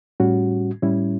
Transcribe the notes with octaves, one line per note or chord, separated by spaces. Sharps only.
A2 G3 C#4 F#4
A2 G3 C#4 E4